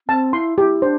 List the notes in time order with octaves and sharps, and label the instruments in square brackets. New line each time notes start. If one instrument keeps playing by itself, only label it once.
[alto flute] C4 [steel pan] A5
[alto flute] E4 [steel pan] C6
[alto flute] E4 [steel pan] G4
[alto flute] D4 [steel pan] C5